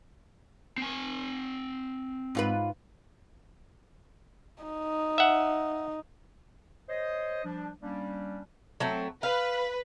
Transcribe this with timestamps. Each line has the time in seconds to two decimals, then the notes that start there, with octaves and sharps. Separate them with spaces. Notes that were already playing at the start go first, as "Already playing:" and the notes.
0.78 C4 G#5
2.35 G#2 F4 B4
4.63 D#4
5.18 E5 F#5
6.89 C5 C#5 D#5
7.45 F3 G3 D4
7.83 G3 A#3 C#4 D4
8.80 F#3 A3 C4
9.23 B4 F5